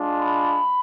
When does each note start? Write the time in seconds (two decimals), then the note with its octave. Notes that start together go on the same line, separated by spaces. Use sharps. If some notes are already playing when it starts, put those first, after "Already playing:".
Already playing: G#3 D4 F4
0.20 B5